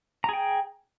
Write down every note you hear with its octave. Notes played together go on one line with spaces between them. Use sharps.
G#4 G5 A#5